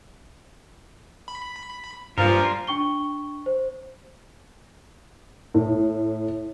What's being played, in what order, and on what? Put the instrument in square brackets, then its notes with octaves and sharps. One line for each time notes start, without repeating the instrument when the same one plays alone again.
[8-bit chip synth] B5
[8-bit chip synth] G2 [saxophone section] A#2 F3 [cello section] F4 [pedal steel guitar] A#4
[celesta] D4 G5 C#6 G7
C5
[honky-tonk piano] A2